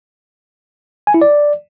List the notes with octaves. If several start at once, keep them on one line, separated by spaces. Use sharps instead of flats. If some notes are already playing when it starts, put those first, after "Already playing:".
G#5
E4
D5